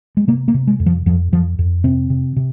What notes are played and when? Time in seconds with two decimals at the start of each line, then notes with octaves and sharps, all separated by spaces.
0.17 G#3
0.28 C3 A#3
0.48 A#3
0.54 C3
0.67 G#3
0.80 F2
0.86 F3
1.06 F2 F3
1.32 F2 F3
1.59 F2
1.84 C3 C4
2.10 C3
2.36 C3